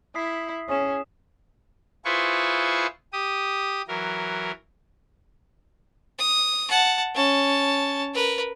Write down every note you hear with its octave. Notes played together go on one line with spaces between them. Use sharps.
E4 D#6 B6 C7
C#4 G#4 D#6 E7
E4 F4 G#4 B4 C5 C#6
G4 D#6
E3 F#3 A#4
D#6
F#5 A5
C#4 A5
A#4 B4